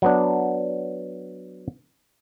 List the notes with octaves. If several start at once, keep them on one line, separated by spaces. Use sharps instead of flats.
F#3 B3 D4